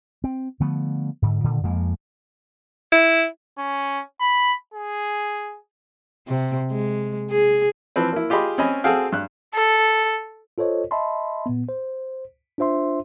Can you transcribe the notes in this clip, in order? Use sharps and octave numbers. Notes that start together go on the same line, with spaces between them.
C4
D3 F3 A3 B3
G#2 D3
A#2 D3 D#3
F2 F3 G#3 A#3
E4
C#4
B5
G#4
C3
G#3
G#4
E3 F3 C4 B4
A#3 E4
F4 G4 G#4 D#5 B5 C6
C4 C#4 D#5 G#5 B5
C4 F#4 G#4 A4 F5 G5
G2 F#6
A4
F4 A4 C5 C#5 D#5
D#5 E5 A5 B5 C6
A#2 B3
C5
D4 F4 C5 E5 C6